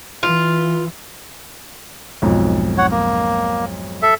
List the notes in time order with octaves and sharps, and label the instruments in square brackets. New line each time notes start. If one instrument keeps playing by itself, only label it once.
[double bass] E3 [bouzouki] F4
[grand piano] B1 F2 G#2
[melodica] C#5 F#5
A#3
A4 E5